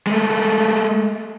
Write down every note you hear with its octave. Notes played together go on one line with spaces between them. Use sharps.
G#3 A3